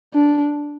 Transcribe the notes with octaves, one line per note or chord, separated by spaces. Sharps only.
D4